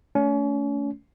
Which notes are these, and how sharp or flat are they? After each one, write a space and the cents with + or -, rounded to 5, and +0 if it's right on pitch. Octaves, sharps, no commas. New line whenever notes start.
A3 +0 C#4 +35